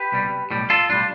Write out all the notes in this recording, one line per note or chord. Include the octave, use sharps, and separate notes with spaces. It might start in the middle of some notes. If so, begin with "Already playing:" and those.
Already playing: G4 B4
C2 B2 G3
B1 A2 G3
F4 A4
B1 A2 G3 D4 F4